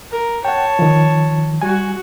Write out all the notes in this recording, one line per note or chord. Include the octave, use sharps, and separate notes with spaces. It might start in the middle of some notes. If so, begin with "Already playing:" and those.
A#4
C#5 F#5 G5 A5
D#3 F3
G3 F#4 G#5